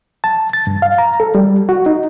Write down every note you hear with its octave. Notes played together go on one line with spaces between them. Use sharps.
A5
A6
G2
F5
A#5
A4
G3
F#4
D#4